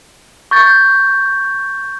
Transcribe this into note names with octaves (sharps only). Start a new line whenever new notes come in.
C#6 G6 A6